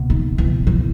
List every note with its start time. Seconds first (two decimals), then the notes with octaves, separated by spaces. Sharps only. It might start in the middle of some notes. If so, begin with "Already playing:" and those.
Already playing: C#2 B2 A#3
0.10 D#3
0.38 E3
0.67 E3